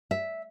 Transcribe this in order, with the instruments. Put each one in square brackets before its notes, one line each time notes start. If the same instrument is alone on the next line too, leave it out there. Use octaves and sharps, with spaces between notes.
[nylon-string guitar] E5